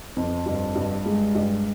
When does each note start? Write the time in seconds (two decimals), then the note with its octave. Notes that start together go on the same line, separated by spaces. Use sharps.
0.17 F2
0.46 G2
0.75 G2
1.06 G#3
1.35 G2